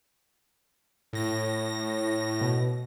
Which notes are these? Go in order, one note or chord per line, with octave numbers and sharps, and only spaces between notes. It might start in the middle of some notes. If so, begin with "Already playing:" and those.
A2 A#6
B2